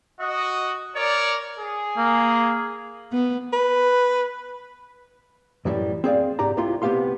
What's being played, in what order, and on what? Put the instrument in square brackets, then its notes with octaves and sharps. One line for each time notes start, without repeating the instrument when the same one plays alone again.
[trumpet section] F#4 D#5
A#4 C#5 D5
G#4
[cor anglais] A#3
[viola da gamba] B3
[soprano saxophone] B4
[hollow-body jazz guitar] F#2 A2 E3 G3
C4 G#4 D5 F5
C2 G#2 G4 D5 A#5
C2 C3 E4 F4 C6
C2 C3 B3 G4 F5 C6